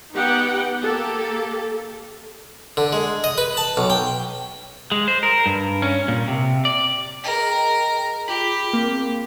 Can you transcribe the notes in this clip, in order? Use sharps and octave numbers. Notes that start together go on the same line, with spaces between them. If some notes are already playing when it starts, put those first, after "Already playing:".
B3 D#4 G4 F#5 G5
A#3 G4 A4
D3
G#3
D#5
B4
A5
B1
G5
G#3
C5
A#4
G2
C#4
A#2
C3
D5
G#4 A#4 D#5 G5
F4 G4 G#4 B5
A#3 C4